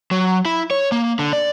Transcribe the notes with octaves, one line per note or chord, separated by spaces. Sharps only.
F#3
E4
C#5
A#3
D3
D5